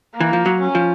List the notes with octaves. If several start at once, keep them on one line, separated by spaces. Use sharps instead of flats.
A#3
E3
F3
F#3
C#4
F3